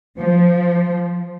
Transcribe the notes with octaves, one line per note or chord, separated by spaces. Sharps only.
F3